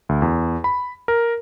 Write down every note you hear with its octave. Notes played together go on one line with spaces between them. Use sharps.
D2
E2
B5
A#4